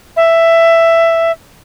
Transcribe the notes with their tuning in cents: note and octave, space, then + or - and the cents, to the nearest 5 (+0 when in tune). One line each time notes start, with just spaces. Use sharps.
E5 +10